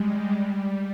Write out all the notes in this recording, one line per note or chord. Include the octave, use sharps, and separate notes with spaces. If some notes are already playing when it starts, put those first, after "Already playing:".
Already playing: G3 G#3
G3